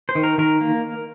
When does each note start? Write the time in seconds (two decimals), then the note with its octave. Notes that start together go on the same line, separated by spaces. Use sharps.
0.09 C5
0.15 D#3
0.24 A#4
0.38 D#3 A#4
0.61 A#3